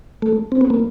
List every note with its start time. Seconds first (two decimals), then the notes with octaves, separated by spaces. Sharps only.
0.22 A3
0.52 C4
0.61 B3
0.70 A#3